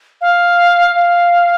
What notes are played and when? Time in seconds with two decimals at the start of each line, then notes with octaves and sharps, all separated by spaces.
0.21 F5
0.96 F5